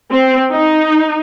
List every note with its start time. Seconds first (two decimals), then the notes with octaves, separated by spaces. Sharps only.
0.12 C4
0.51 D#4